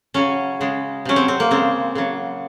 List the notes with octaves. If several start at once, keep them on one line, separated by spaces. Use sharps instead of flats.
C#3 F#3 C#4
C#3 G#3
C3 F#3 C#4
C4
C4
A#3
C#3 G#3 C4
C#3 F#3